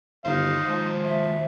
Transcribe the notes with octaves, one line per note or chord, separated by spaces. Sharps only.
G1 D#2 D#4 C5 F5
F3 G#3
E5